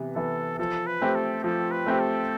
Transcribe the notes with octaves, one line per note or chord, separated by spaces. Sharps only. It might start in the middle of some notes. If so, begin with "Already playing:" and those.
Already playing: C3 E3 B3
E3 B3 A4
F3 A4
B4
A3 C4 G4
A4
F3 A4
B4
A3 C4 G4
A4